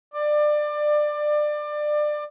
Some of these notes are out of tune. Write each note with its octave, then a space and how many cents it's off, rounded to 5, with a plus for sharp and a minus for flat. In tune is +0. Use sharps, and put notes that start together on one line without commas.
D5 +25